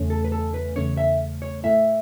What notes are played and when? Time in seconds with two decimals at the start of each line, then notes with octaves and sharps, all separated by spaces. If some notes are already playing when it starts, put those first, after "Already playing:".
Already playing: E2 C#3 A3 C#4
0.10 A4
0.25 B4
0.32 A4
0.54 B4
0.76 E2 C#3 A3 C#4 C#5
0.97 E5
1.42 C#5
1.63 A2 A3 E4 E5